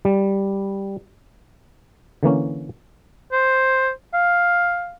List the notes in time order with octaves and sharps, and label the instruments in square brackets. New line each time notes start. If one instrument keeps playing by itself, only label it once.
[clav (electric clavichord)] G3
D3 E3 A#3 C#4
[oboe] C5
F5